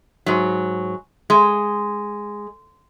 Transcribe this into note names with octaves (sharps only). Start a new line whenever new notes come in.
G#2 F#3
G#3